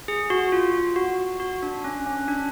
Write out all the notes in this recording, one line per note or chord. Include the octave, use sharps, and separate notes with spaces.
G#4
F#4
F4
F#4
F#4
D4
C#4
C#4
D4